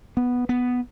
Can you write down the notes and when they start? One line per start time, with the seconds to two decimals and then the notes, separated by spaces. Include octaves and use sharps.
0.17 B3
0.49 B3